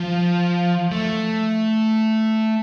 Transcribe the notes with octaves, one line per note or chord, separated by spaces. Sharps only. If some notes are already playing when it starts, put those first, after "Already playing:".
Already playing: F3
A3